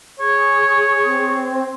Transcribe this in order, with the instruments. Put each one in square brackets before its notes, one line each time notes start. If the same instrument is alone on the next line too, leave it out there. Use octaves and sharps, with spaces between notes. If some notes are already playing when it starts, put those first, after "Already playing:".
[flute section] G#4 C#6 [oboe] C#5
[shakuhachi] C4